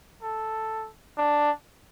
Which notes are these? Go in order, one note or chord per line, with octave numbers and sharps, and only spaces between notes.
A4
D4